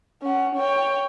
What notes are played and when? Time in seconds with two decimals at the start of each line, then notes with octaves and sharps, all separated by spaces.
0.22 C#4 F#5
0.55 C#5 G5